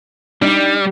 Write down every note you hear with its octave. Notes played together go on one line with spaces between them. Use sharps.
G3 D4 D#4